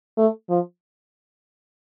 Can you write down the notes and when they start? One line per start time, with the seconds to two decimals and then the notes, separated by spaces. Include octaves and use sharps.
0.17 A3
0.49 F3